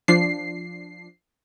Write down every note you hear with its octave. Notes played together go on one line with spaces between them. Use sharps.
F3 D4 C7